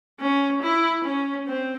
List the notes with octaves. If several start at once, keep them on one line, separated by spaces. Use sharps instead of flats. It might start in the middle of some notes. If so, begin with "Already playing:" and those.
C#4
E4
C#4
C4